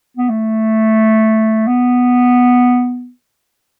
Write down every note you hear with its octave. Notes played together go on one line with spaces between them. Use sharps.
B3
A3
B3